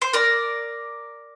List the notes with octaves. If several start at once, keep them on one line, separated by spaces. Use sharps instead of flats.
C5
A#4 D5